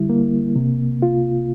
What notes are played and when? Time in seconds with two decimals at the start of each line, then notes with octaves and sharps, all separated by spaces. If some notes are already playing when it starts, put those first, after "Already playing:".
Already playing: D3 G3 E4
0.10 A#3
0.56 C3
1.02 F4